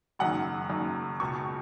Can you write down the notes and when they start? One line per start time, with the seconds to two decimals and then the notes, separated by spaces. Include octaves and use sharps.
0.19 F#1 F#2 D#3 F#5
0.69 F#1 F#2 D#3
1.20 C#2 B2 C#6